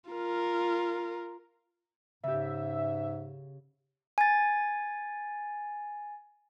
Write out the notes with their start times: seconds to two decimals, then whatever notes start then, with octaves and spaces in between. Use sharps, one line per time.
0.11 F4 A#4
2.23 G#2 C#3 G4 E5
4.18 G#5 A6